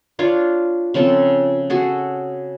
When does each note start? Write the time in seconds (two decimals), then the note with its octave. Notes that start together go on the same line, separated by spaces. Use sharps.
0.19 D4 F4 C#5
0.94 C#3 F3 C4 A4
1.70 F#4 G#4 A4